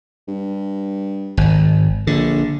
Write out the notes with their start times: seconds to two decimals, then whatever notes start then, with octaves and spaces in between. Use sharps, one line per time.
0.28 G2
1.37 G#1
2.07 A#1 D3